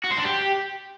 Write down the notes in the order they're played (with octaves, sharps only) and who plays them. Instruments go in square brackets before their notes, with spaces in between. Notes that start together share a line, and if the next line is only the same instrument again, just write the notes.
[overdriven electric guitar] F#4
C5
D4
G4